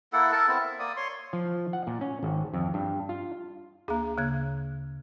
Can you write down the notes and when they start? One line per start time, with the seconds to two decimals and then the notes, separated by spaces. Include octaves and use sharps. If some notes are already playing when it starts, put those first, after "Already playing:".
0.13 A#3 E4 A4 F#5
0.32 A4 A#4 A5
0.48 B3 C4 E4
0.61 E5
0.79 A#3 D5 D#6
0.97 C#5 C6
1.33 F3
1.73 F#5
1.87 A#2
2.01 C#4
2.23 G#1
2.54 F2
2.74 G2
3.09 F4
3.88 D2 A#3 G#4 A#5
4.18 C#3 A#3 F#6 G#6